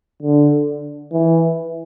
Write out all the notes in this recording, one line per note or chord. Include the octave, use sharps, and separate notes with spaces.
D3
E3